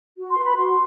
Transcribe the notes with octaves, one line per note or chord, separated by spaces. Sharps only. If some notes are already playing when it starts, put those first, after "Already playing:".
F#4
C6
B4
B5
F#4 C6